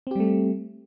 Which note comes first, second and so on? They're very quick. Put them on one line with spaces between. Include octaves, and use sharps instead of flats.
C4 G4 G3 A3